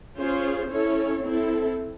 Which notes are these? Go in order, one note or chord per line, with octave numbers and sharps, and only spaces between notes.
C#4 F4 G#4 C5
C#4 E4 A4 C#5
C4 E4 A4